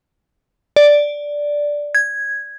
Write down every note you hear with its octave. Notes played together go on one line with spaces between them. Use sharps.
D5
G#6